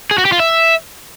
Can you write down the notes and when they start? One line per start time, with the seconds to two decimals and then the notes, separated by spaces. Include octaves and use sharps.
0.11 G#4
0.18 F#4
0.25 G4
0.32 F4
0.40 E5